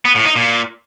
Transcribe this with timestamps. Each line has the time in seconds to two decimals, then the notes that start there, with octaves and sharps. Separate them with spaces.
0.05 B3
0.15 A2
0.25 D#4
0.36 A#2